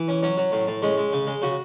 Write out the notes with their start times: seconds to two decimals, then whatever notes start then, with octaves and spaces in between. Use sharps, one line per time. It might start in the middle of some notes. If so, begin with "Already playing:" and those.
Already playing: E3
0.08 C#4
0.22 F#3 C#4
0.37 F#3
0.52 A2
0.67 A2
0.82 G#3 C#4
0.98 G#3
1.13 C#3
1.27 G#3
1.42 C#3 F#4